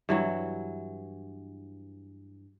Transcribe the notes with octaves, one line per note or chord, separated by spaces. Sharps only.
G2 E3 F#3